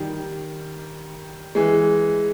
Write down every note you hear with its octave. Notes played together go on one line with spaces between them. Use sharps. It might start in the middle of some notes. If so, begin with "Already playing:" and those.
Already playing: D#3 G3
E3 G#3